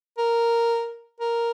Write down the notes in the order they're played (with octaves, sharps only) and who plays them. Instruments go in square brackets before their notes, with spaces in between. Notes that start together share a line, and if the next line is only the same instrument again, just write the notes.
[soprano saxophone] A#4
A#4